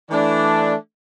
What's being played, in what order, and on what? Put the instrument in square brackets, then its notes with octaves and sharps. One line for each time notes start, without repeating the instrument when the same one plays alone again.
[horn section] E3 A3 D4